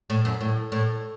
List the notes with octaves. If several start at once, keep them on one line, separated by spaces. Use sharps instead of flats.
A2
F#2
A2
A2